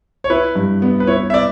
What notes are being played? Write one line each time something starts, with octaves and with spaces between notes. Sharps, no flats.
C#5
E4 B4
G2
B3
B4
E4 C#5
E5
B3 D5